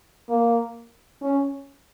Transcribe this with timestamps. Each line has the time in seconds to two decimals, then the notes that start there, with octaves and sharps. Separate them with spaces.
0.29 A#3
1.22 C#4